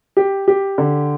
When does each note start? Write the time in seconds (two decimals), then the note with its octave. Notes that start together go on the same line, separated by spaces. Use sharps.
0.17 G4
0.48 G4
0.78 D3